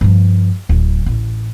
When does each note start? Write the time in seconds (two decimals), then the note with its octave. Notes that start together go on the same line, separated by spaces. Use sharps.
0.01 G2 F3
0.69 D1
1.06 A1